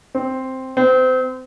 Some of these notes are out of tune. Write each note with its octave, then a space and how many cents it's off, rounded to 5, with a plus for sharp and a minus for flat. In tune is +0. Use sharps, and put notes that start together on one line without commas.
C4 +0
C4 -30